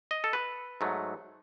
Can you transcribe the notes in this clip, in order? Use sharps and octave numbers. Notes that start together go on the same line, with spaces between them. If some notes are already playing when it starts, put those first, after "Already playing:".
D#5
A4
B4
G#2 F#3 A3